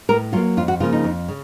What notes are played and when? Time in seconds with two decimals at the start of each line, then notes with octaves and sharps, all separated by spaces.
0.09 A2 A#4
0.33 F#3 A#3 F4
0.57 F2 F4
0.68 F#4
0.80 C#3 F3 A#3 F4
0.92 D#4
1.04 F2
1.28 C#3